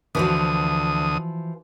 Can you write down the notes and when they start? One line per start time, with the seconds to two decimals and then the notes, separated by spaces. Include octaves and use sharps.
0.15 D2 E3 F3 F#4 D#6